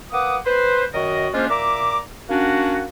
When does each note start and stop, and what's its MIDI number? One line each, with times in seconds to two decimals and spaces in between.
0.12 0.38 58
0.12 0.38 71
0.12 0.38 78
0.12 0.38 86
0.12 0.38 87
0.46 0.85 71
0.46 0.85 72
0.94 1.27 42
0.94 1.27 51
0.94 1.27 66
0.94 1.27 70
0.94 1.27 75
1.34 1.46 56
1.34 1.46 58
1.34 1.46 61
1.34 1.46 62
1.34 1.46 65
1.34 1.46 72
1.49 2.00 46
1.49 2.00 76
1.49 2.00 82
1.49 2.00 86
2.29 2.85 58
2.29 2.85 61
2.29 2.85 62
2.29 2.85 66